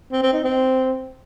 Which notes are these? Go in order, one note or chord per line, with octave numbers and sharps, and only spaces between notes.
C4
C4
D#4
C4